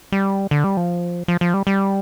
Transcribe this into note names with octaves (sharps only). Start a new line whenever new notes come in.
G3
D3
G3
F3
F3
F3
G3
G3